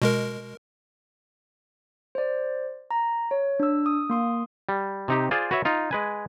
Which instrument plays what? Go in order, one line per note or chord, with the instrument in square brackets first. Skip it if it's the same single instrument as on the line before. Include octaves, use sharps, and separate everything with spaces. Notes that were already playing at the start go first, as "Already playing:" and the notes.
[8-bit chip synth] B2 G#3 A#4
[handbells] C5 D5
A#5
C#5
D4 E6
D#6
A#3 C6 D#6
[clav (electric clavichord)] G3
C3 D#4 G4
F4 G#4 C5 D5
F#4 B4 C#5 E5
D#4 F4
G#3 B4 G#5